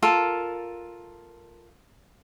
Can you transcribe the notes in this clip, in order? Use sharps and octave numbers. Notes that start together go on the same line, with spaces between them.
F4 A4 A#4